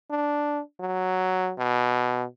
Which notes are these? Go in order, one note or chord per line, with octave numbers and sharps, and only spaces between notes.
D4
F#3
B2